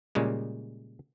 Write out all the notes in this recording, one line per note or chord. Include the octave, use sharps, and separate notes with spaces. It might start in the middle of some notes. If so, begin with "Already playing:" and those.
A#2 C#3 G3 G#3